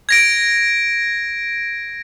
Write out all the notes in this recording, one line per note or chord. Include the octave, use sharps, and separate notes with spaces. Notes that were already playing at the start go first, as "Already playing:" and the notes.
G#6 A#6 D7